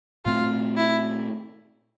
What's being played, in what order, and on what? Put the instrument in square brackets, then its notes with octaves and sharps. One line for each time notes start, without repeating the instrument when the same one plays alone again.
[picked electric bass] A#2 A3 C4 [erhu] F4
[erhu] E4